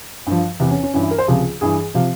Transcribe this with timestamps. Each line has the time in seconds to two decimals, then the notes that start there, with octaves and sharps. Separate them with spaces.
0.27 G2 F3
0.60 E2 C3 E3 E4
0.71 C#4
0.83 C#4
0.94 G2 E3 C#4
1.03 E4
1.11 A#4
1.18 C5
1.27 C#2 C3 F3 G#4
1.61 G2 E3 G#4
1.94 C3 F3 F5